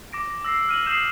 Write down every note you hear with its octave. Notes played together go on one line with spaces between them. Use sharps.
D6 A#6 D7
A#6
E6 A#6 C7
F6 D#7 F#7
D#6 G6 C7 E7 F#7